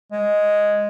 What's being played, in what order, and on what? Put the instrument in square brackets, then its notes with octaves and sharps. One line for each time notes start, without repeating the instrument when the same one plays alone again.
[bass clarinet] G#3